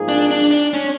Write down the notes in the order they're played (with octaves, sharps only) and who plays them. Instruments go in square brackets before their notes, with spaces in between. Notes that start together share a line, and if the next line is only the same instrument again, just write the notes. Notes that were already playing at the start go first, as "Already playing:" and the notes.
Already playing: [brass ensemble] G#2 F3 A#3 D#4 G#4
[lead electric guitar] D4
D4
D4
C#4